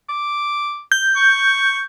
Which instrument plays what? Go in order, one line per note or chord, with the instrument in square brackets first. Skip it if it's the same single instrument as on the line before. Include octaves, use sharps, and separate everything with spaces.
[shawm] D6
[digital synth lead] G6
[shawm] C#6